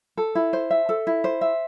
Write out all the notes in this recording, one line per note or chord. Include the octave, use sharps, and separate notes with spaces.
A4
E4
C5
E5
A4
E4
C5
E5